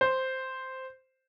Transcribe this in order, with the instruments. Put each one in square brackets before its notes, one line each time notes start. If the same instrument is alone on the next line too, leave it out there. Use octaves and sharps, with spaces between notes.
[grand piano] C5